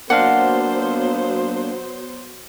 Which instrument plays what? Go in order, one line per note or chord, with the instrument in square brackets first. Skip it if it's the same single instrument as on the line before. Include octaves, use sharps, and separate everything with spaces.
[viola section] F#3 B3 C5 [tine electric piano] A#3 D4 F5 [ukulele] F#5